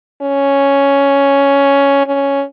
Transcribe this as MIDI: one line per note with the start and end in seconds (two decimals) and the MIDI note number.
0.22 2.04 61
2.07 2.44 61